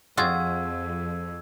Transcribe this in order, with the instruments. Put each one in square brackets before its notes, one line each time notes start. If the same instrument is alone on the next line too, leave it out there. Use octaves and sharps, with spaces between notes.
[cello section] F2 [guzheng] F4 F#4 G#4 [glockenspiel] E6 G#6